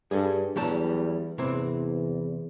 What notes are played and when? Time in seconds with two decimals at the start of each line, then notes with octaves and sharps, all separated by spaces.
0.11 G2 G#4 A4
0.56 E2 F#3 G3 A5
1.38 E2 C3 E3 C4